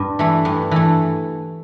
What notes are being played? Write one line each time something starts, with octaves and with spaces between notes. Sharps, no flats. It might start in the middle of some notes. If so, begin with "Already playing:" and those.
Already playing: G2
E3 A3
G2
E3 A3